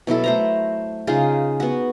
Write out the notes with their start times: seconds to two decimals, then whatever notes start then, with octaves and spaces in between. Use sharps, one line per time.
0.07 B2 F#3 E4 A4
0.24 A3 C5 A#5
1.07 C#3 D#4 F4 G#4
1.60 B3 F#4